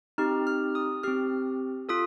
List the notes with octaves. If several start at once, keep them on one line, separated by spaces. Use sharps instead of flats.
C4 D#4 G4 F6
F6
D#6
C4 G4 F6
F4 A4 D#6